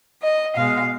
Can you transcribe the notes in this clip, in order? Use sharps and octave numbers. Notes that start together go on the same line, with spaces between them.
D#5
B2 G#3 F5